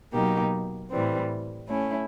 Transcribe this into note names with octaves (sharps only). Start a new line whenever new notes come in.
B2 F#3 A#3 D#4 G4
A2 E3 G3 C4
A3 C#4 E4